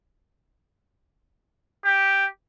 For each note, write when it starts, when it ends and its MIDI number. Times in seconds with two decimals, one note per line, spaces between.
1.84 2.25 67